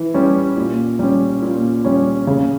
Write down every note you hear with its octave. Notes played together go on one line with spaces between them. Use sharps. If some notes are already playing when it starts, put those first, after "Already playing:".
Already playing: E3
G3 C#4
A#2
G3 C#4
A#2
G3 C#4
C#3